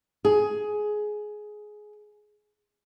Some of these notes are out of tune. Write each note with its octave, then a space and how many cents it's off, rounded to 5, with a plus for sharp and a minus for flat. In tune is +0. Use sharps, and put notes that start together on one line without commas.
G#4 +15